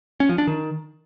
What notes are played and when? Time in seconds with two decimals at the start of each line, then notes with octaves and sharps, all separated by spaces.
0.20 C#4
0.29 F3
0.38 D4
0.47 D#3